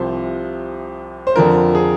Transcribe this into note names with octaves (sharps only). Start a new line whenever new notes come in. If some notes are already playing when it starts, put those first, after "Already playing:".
Already playing: C2 C3 F3 C5
C5
F2 D3 F3 A#4
G#4